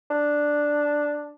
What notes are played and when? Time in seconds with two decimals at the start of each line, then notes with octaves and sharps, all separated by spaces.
0.10 D4